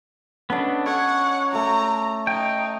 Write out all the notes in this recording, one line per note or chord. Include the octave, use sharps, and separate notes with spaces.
B3 C#4 D4 A4 D#5
A4 C#5 F#5
A3 A#5 D6
D#4 G5